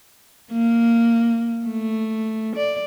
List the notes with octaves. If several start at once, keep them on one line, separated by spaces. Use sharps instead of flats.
A#3
A3
D5